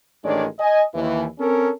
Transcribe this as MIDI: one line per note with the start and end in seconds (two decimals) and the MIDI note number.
0.23 0.45 33
0.23 0.45 51
0.23 0.45 56
0.23 0.45 62
0.23 0.45 73
0.23 0.45 74
0.59 0.82 75
0.59 0.82 80
0.94 1.25 39
0.94 1.25 52
1.39 1.69 60
1.39 1.69 61
1.39 1.69 69
1.39 1.69 70